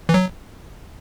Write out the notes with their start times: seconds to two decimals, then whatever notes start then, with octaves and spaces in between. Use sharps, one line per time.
0.09 E3
0.14 F#3